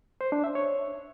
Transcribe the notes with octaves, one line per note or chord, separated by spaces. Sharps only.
C5
D4
E5
C#5